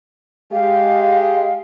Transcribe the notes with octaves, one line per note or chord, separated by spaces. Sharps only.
G#3 G4 F5